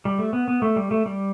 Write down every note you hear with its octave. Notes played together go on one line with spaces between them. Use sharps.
G3
A3
B3
B3
A3
G3
A3
G3